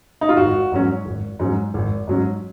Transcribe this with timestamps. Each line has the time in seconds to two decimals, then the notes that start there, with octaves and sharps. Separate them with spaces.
0.21 D#4
0.29 F4
0.37 G#1 F#4
0.72 G#2 F#3 C#4
1.06 G#1
1.39 G#2 F#3 C#4
1.74 G#1
2.08 G#2 F#3 C#4